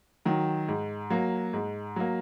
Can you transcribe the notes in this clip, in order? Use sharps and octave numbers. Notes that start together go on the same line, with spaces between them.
D#3 F#3
G#2
F#3 A#3
G#2
F#3 A#3